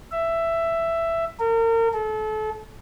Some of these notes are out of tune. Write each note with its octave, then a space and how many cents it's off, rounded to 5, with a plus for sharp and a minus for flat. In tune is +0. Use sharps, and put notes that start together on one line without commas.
E5 +10
A#4 -35
A4 -30